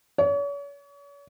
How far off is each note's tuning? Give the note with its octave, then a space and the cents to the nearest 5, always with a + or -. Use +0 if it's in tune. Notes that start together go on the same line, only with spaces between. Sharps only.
C#5 +40